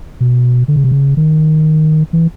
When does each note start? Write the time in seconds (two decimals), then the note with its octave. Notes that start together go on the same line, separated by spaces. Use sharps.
0.21 B2
0.68 D3
0.76 C#3
0.84 C3
0.91 C#3
1.17 D#3
2.13 E3